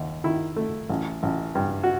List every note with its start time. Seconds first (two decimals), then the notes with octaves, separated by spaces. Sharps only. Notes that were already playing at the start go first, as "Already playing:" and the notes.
Already playing: D#2
0.24 D#3 E4
0.56 A3
0.89 A1
1.23 A1
1.55 G2
1.84 F#4